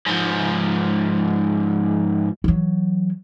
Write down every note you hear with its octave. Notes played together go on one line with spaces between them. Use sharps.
G#2 F3
E3 F#3